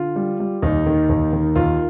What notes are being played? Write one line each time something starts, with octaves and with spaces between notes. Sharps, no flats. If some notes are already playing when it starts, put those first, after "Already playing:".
Already playing: D3 F4
G3
G3
D#2 D#4
D#3
D#2
D#3
D#2 F4